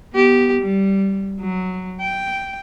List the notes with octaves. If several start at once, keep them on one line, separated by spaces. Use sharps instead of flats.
B3 G4
G3
F#3
G5